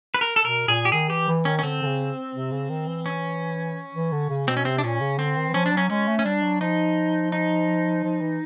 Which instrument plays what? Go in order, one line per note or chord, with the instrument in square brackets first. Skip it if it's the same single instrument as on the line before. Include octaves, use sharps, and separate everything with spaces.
[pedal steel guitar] B4
A#4
A4
[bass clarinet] B2 [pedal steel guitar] A#4
[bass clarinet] A#2 [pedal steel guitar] G#4
[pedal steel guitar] G4
[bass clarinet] D#3 [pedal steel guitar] G#4
[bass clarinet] E3 [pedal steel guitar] G4
[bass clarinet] E3
[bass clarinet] D#3 [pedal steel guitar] C#4
[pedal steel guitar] C#4
[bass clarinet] D3 [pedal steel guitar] C4
[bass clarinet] D3
C#3
C3
C#3
D#3
E3
[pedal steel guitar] C#4
[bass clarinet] E3
D3
C#3
[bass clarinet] B2 [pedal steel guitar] C4
[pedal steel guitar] C#4
[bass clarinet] C3 [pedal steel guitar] C4
[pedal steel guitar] D4
[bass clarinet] A#2 [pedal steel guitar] C#4
[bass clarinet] C#3
[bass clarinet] D3 [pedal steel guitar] C4
[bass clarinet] D#3
E3
[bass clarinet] F3 [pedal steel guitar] C#4
[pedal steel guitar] D4
[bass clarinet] F#3 [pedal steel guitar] C#4
[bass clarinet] G#3 [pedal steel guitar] C#4
[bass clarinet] A3
[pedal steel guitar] C#4
[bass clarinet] G3 [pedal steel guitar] D4
[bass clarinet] F#3
[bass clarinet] F3 [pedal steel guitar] D#4
[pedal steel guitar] D#4
[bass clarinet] F3
E3